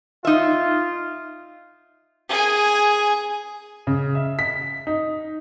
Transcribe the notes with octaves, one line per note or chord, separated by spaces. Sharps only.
D#4 F4 E5
G#4 G#5
C#3
E5
B6
D#4